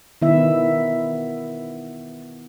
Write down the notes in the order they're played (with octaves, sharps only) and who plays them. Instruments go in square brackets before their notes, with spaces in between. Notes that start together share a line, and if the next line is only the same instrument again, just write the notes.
[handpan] D#3 B3 E4 E5